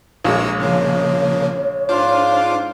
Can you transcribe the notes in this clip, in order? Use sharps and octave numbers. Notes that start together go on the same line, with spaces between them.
A#1 G#3 A#4 C#5 E6
C#3 F3 A#3 C#5
G#2 D4 F4 C5 D6